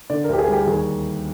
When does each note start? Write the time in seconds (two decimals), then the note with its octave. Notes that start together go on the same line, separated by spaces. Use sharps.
0.10 D3 D5
0.24 A#4
0.29 D2 G4
0.38 G#4
0.48 G3 G4
0.67 D#2 G#4